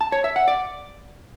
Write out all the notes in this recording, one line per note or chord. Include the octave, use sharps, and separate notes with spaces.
A5
C#5
E5
F#5
D5